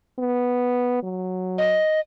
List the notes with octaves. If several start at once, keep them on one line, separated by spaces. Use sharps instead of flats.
B3
F#3
D#5